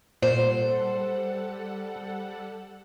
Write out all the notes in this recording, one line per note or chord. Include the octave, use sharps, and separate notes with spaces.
A#2 G3 A4 C5 F#5